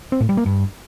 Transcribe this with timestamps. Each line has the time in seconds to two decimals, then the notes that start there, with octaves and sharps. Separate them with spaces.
0.12 C4
0.21 A2
0.29 G3
0.37 A#3
0.46 G2